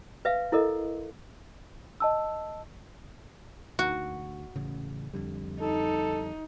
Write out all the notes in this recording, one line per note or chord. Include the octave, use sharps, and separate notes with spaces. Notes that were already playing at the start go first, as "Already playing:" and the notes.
B4 E5 F5
E4 A4 A#4 D#5
D#5 A5 E6
D2 F#4
A1 C#3
F2 D3 G3
D#4 A4